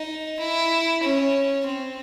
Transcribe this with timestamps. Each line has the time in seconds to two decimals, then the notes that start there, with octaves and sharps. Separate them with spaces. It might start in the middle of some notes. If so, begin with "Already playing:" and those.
Already playing: D#4
0.40 E4
1.03 C#4
1.66 C4